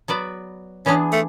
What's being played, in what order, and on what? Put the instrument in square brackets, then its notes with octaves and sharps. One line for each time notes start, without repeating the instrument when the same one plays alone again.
[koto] F#3 B3 F#4 B4 D5
[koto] E3 B3 D4 G#4 [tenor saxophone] C#4
[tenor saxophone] A3